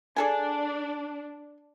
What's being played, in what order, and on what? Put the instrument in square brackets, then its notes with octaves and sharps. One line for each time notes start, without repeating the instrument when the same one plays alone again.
[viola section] D4 [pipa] G#4 A4 G#5